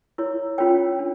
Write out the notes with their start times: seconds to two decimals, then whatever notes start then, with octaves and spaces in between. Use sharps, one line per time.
0.18 E4 A#4 C#5
0.58 C#4 F4 A#4 C#5 G5
0.99 D4